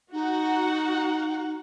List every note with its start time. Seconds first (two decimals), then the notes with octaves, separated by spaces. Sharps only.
0.12 D#4 F#4 F#5